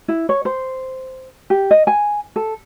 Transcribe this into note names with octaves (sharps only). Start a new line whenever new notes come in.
E4
C#5
C5
G4
D#5
G#5
A4